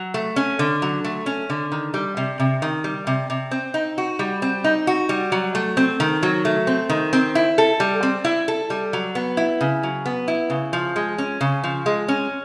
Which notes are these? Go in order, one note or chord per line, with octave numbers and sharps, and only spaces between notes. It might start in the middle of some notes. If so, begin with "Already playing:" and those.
Already playing: F#3
A3
C#4
D3
F#3
A3
C#4
D3
D#3
G3
C3
C3
D#3
G3
C3
C3
C4
D#4
F#4
G3
C4
D#4
F#4
G3
F#3
A3
C4
D#3
F#3
A3
C4
D#3
C4
E4
A4
G3
C4
E4
A4
G3
F#3
B3
E4
C#3
F#3
B3
E4
C#3
F3
G#3
C#4
C#3
F3
G#3
C#4